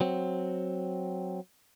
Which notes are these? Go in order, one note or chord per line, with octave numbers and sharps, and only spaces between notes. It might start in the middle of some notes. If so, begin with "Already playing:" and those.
F#3 C4